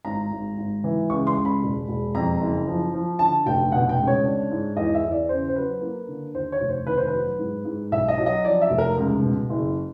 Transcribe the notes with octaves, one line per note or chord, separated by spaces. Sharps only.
G#1 A#5
G#1
G#1
E3
C#2 C#6
C6
C#2
B5
E1
E1
F2 A#5
F#1
F3
F3
D3 A5
F1 G5
B2 F#5
G5
C#2
C#5
D4
G#2
E2 D#5
E5
E2
D5
C#3 C5
C5
F#3 B4
A#3
D3
D#2 C5
C#5
F1
C5
D#3 B4
C5
B4
F#3
G#2
G#2
B1 E5
D#5
F#3
D#5
F3 D5
E5
F1
A#4
C#2
B2
F#1